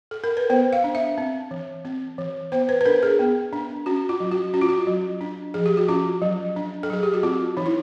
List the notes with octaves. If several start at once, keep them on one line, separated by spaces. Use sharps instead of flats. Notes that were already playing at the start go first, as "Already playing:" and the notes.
A4
A#4
B4
B3 C5
F5
D4
E5
C4
E3
C4
E3
B3 C5
B4
B4
D4 A#4
G#4
B3
D4
C#4 F#4
F4
F#3
F#4
C#4 F#4
F4
F#4
F#3
D4
F3 G#4
G4
F#4
C#4 F4
F#3
D4
A4
F#3 G#4
G4
F#4
C4 F4
E3 D#4
E4